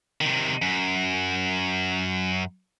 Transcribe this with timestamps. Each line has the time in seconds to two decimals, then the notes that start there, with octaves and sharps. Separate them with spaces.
0.21 C3 D#3
0.62 F#2